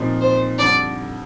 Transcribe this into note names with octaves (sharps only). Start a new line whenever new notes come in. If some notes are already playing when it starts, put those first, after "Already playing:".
Already playing: A#2 F3 C4 D#4
C5
F2 D3 G3 D5